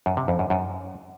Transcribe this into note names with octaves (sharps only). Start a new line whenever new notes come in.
F#2
C3
F2
F#2
F#2